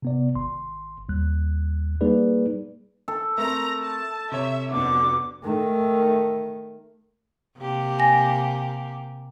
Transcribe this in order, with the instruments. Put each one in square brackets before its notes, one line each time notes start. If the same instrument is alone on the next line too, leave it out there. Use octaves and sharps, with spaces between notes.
[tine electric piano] C3 B3 D5
G#1 C6
D#2 G3 F#6
G3 A#3 D#4 G#4 B4 D5
[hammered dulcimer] A4
[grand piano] A3 C4 A#4 [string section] A#5 A#6
[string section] A5
[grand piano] C3 C#5 [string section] E5
[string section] F2 B2 D3 [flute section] F#5 D6
[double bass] D#3 A3
[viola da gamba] C3 A#3 G4
[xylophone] G#5 A#6